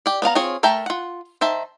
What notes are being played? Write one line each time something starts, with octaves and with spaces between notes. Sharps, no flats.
G4 D5
B3 D4 F5 A#5
C4 F4 G#4 C#5
A3 A#4 E5 G5 A5
F4 F#5
D#3 C5 E5 A5